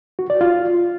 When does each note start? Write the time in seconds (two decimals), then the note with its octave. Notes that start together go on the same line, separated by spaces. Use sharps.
0.19 F#4
0.30 D5
0.41 F4